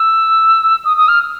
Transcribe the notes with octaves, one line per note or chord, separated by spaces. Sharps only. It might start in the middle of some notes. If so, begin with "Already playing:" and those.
Already playing: E6
D#6
D#6
F6